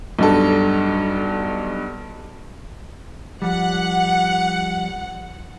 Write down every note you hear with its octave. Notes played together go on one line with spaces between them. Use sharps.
B1 G2 A4
F3 G3 F#5